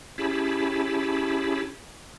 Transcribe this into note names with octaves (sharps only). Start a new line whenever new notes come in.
C#4 E4 G4 G#4 A5 B5